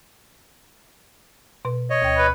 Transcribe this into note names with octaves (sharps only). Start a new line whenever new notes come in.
B2 B4
C#5 D#5
D2 G5
B4